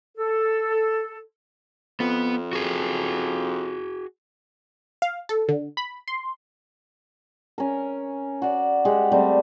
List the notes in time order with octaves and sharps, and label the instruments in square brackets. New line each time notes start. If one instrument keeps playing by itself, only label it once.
[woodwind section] A4
[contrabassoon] F2 [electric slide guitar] B3
[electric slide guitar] F#4 G#4
[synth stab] F5
A4
D3
B5
C6
[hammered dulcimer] C#4 A#4
F#4 D5
G#3 F#4 G4
G3 A3 C4